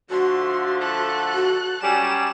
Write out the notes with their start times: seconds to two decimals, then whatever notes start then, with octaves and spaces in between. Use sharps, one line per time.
0.10 D3 F3 A3 F#4 C6
0.81 A4 F#6
1.34 F#4
1.83 F#3 G3 C#4 G#5 E7